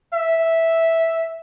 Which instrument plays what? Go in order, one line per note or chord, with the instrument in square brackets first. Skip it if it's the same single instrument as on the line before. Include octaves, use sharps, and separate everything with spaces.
[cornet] E5